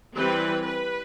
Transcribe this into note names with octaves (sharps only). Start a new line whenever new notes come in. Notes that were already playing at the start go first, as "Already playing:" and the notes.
E3 G3 C4 B4
B4